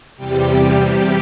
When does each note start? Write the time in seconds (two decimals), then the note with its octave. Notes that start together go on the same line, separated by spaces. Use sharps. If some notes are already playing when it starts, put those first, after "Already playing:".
0.16 E2 C3 G3 G4